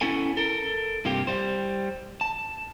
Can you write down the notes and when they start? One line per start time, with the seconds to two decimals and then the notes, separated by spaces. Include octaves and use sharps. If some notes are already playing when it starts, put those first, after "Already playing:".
0.01 B3 C#4 E4 F#4 A4 G#5
0.37 A4 A#4
1.05 G2 C3 A#3 F4 G4
1.27 G3 C5
2.21 A5